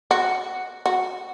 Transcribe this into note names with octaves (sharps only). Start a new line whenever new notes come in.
F#4
F#4